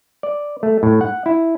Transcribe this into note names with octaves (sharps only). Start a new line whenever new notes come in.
D5
A3
A2
F#5
E4